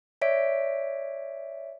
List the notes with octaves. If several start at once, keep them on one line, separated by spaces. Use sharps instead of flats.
C#5 D5 E5 B6 D7